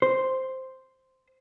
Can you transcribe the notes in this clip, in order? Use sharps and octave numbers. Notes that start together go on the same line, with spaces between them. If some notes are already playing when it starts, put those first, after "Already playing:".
C5